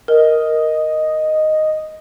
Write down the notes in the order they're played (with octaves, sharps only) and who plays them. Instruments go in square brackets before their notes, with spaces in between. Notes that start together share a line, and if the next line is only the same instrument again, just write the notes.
[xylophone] A#4 [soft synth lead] D#5